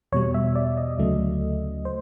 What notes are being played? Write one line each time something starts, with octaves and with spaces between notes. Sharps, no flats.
E2 B2 G3 C#5
E5
D5
D#5
D2 C#3 F#3 A3
C5